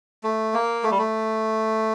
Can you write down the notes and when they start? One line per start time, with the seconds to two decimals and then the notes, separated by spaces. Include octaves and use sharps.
0.24 A3
0.54 A#3
0.84 A3
0.91 G3
0.98 A3